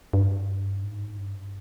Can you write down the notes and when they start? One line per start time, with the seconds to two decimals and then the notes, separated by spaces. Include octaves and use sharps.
0.13 G2
0.84 G#2
1.18 G2